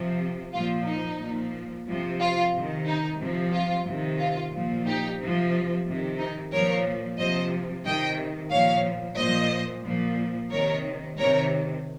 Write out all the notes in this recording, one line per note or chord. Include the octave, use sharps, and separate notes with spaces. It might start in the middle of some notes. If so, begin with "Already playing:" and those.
Already playing: C3 F3
A#2 F3 F4
D#4
A#2 F3
C3 F3
F4
C3 D#3
D#4
C3 F3
F4
C3 D#3
F4
A#2 F3
D#4 G4
C3 F3
C3 D#3
D#4
A#2 F3 A#4 C#5
C3 F3 C5 D#5
C3 D#3 D#5 G5
A#2 F3 C#5 F5
A#2 F3 C5 D#5
A#2 F3
C3 D#3 A#4 C#5
C3 D#3 A#4 C#5